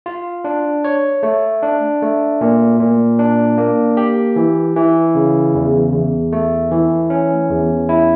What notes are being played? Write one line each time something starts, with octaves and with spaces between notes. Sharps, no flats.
F4
D4
C#5
A3
D4
A3
A#2
A#2
D4
A#3
G4
E3
E3
C#3
E2
E2
A3
E3
C#4
E2
E4